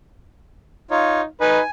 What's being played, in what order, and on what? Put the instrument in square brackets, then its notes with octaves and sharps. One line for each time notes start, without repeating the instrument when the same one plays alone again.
[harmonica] D#4 [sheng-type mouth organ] F4 C#5
[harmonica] D#4 B4 [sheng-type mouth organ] G#5